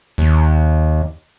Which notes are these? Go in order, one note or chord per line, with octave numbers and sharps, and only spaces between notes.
D#2